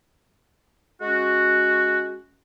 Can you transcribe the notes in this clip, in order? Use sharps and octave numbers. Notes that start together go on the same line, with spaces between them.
G#3 C#4 F#4